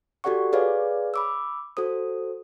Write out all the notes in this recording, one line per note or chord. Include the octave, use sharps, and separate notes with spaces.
F#4 G4 A4 D5 F#5 C#6
G#4 B4 C#5 D5 F5
B5 D6 E6
F#4 A4 C5 D#6